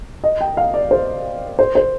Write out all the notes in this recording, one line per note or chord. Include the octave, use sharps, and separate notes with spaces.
D#5
G5
F5
D5
C5
C5
C5